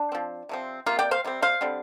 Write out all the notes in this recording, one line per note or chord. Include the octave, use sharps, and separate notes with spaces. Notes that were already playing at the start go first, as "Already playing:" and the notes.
Already playing: D4
F3 C4
C3 F3 C4
C3 A#3 F4
D5 G5
C5 F5
C3 G3 C4
C5 F5
D3 G3 C4